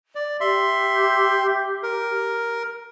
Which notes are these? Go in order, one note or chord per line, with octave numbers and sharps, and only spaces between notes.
D5
G4 E5 C6
A#4